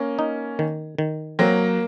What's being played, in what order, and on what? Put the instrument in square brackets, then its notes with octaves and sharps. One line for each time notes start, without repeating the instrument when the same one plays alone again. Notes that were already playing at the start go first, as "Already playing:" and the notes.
Already playing: [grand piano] A#3 C#4
[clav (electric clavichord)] D#4
D#3
D#3
[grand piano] F#3 A#3 [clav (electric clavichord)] C4